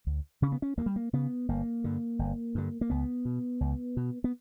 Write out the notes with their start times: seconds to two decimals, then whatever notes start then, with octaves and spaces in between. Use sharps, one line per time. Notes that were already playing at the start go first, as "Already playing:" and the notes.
0.07 D2
0.42 C#3 C#4
0.52 B3
0.62 C#4
0.78 D2 A#3
0.86 G3
0.96 A#3
1.13 C#3 B3
1.49 G1 A#3
1.84 G2 D3
2.19 G1
2.55 G2 D3
2.81 A#3
2.90 C#2 B3
3.25 B2
3.61 C#2
3.97 B2
4.24 B3